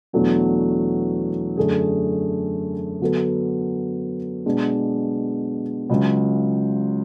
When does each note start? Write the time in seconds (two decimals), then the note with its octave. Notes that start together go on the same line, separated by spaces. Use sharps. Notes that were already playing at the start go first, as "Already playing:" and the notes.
0.13 E2 B2 F#3 A3 D4
1.57 F#2 D3 A3 D4 G#4
3.01 D3 F#3 B3 F#4 A4
4.46 B2 G#3 D4
5.89 C#2 C#3 F#3